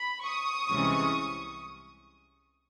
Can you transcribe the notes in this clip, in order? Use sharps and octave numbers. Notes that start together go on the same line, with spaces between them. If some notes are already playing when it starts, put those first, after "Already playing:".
Already playing: B5
C#6 D#6
C2 C3 E3 G#3 C#4